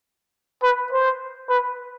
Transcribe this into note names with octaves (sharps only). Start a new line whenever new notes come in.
B4
C5
B4